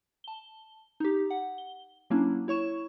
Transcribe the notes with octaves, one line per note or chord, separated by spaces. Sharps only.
A5 G7
D#4 G4
F#5
G7
F#3 A#3 C#4 D4 E4
E4 C#5 C#6 E7